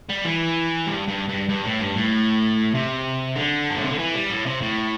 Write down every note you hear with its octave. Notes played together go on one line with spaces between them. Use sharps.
G3
E3
G2
G2
G2
G2
A2
G2
A2
C3
D3
G2
A2
C3
D3
E3
G3
A2
C3
A2